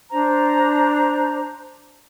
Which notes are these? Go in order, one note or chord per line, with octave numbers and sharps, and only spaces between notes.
D4 C5 A#5